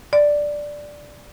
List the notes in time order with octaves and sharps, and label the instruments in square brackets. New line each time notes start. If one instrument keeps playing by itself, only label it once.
[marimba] D5